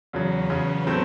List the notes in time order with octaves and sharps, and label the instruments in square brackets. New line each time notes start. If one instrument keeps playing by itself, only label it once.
[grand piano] E2 C#3 F#3 [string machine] C#4
[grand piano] E2 C#3 F#3 [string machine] B3
[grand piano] A2 F#3 A3 C4